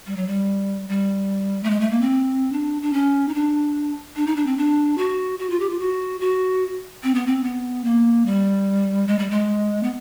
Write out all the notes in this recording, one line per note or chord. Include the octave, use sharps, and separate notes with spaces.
G3
F#3
G3
G3
A3
G#3
A3
A#3
C4
D4
D4
C#4
D#4
D4
D4
D#4
D4
C4
D4
F#4
F#4
F4
G4
F4
F#4
F#4
C4
B3
C4
B3
A#3
G3
G#3
G3
G#3
B3